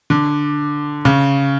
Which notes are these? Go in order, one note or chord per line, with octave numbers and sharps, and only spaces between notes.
D3
C#3